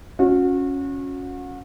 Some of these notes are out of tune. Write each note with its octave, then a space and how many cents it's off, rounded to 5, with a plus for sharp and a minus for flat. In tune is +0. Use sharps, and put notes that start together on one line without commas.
C#4 +0 F#4 -35